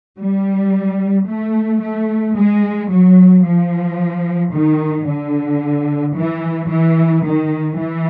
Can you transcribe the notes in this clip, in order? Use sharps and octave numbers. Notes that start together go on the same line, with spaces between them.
G3
A3
A3
G#3
F#3
F3
D#3
D3
E3
E3
D#3
E3